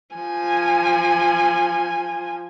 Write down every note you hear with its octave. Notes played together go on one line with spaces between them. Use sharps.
F3 G#5